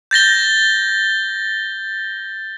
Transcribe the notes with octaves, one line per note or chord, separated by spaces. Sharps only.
G6 A6 A#6 G7